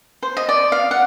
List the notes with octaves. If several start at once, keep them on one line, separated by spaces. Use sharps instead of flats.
C5
D#5
D5
F5
F#5